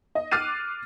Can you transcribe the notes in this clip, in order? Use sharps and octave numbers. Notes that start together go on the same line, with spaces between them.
D#5
D6 F6 F#6 A6 C7 D#7